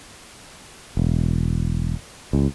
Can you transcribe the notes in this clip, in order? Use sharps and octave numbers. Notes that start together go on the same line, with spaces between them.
E1
C#2